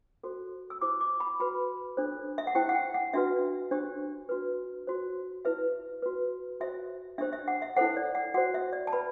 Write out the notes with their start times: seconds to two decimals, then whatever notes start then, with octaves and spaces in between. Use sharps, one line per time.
0.23 F#4 A4 C5
0.70 E6
0.81 E4 G4 C5 D6
1.01 D6
1.20 B5
1.40 F#4 B4 B5
1.97 D4 A4 C5
2.38 E5
2.47 F#5
2.55 E4 G4 C5 G5
2.69 F#5
2.75 G5
2.94 F#5
3.14 D4 F#4 B4 E5
3.71 D4 G4 C5
4.29 F#4 B4
4.87 F#4 C5
5.45 E4 B4 E5
6.02 F#4 B4
6.60 F#4 C5 E5
7.18 D4 G4 C5 E5
7.33 E5
7.48 F#5
7.62 E5
7.77 E4 A4 C5 F#5
7.97 D5
8.15 F#5
8.34 F#4 F#5
8.38 C5
8.54 E5
8.73 D5
8.87 A5
8.93 B4 B5